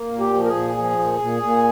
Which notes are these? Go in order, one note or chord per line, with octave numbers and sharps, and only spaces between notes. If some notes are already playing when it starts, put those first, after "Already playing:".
Already playing: A#3
A#2
G4
F3
A#4
G#4
A#2
F3
A#2
A#2
A#2